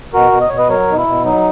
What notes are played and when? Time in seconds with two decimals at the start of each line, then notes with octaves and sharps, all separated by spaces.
0.13 B2 F#4 A#4
0.32 B2
0.41 D#5
0.49 B2 C#5
0.57 B4 D#5
0.69 F#3 A#4 C#5
0.88 B2 D#4
0.98 E4
1.07 B2
1.25 F#3 D#4